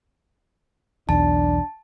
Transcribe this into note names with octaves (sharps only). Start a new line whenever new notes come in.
B1 E2 D4 A5